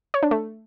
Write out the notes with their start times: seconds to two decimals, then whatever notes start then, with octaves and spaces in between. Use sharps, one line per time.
0.14 C#5
0.23 D4
0.31 A3